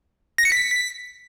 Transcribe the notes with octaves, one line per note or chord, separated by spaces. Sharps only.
A#6
C#7
B6